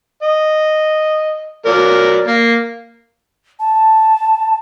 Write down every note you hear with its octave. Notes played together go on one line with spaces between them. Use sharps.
D#5
F#3 A#4 D5
A#3
A5